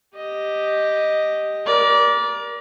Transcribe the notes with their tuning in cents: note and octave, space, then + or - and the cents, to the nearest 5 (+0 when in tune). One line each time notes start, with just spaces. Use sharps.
G4 +0 D#5 +0
A#4 +30 D5 -15